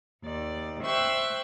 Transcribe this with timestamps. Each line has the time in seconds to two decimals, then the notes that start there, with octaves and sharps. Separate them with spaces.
0.23 D#2 D5
0.83 C5 E5 G5 C#6 E6 F#6